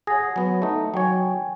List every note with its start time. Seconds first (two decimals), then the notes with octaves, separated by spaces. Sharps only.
0.07 G#4 C#5 F#5 A#6
0.36 F#3 B3
0.62 A3 D#4
0.94 F#3 C#5 G5 G#5